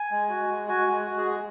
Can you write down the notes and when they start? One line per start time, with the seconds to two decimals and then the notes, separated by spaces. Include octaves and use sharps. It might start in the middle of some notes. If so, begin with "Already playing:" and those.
Already playing: G#5
0.12 G#3
0.29 F#4
0.49 G#3
0.68 F#4 G#5
0.87 G#3
1.06 F#4
1.18 G#4
1.24 G#3